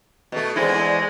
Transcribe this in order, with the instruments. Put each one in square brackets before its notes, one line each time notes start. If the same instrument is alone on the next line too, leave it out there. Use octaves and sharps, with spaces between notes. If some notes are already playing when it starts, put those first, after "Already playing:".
[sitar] B2 A3
[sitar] E2 C4 E4 [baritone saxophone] G#3